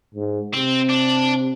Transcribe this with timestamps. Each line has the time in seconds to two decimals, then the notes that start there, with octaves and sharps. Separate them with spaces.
0.15 G#2
0.54 C3 C4
0.90 D4